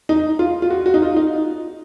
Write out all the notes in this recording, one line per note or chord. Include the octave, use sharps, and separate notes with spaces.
D#4
F4
F4
F#4
F#4
D#4
F4
D#4